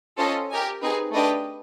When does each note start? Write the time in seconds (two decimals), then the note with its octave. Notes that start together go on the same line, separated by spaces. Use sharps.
0.18 C#4 F4 A4 C5 D#5
0.50 G4 A#4 D#5 G#5
0.81 C4 D#4 G#4 B4
1.12 A3 D4 G4 B4 D#5